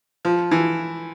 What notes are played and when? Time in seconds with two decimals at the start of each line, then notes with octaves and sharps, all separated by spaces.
0.25 F3
0.51 E3